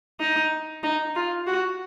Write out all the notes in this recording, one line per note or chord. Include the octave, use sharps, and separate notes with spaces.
D#4
D#4
F4
F#4